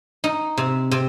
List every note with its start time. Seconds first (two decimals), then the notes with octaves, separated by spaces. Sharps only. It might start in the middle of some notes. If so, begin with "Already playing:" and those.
0.24 D#4
0.57 C3
0.91 C3